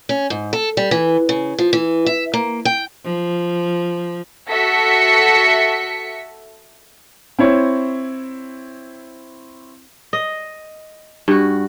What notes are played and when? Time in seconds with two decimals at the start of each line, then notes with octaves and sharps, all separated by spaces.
0.09 C#4
0.30 G#2
0.53 A4
0.77 G3
0.91 E3
1.29 C#3
1.59 F3
1.73 E3
2.06 E5
2.34 A#3
2.65 G5
3.04 F3
4.48 F#4 A4 E5 B6 C#7
7.39 C4 E4 C#5
10.13 D#5
11.28 G2 F#4